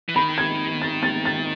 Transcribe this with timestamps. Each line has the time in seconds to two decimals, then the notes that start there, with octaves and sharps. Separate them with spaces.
0.09 E3
0.16 D#3 B5
0.38 G#6
0.82 A6
1.03 A6
1.25 A6